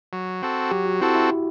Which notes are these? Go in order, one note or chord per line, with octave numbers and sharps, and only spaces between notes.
F#3
C4 F#4 A4
F#3 G4
F#4
C4 E4 F#4 A4
E4